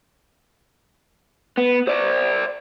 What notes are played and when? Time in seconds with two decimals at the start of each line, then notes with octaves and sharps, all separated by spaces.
1.58 B3
1.88 C5 D5